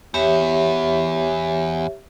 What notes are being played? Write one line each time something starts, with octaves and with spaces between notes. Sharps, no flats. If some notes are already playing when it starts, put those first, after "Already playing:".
E2 G4 C#5 E5